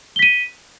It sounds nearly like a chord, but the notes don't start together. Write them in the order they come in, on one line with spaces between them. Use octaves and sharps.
G7 B6 D#7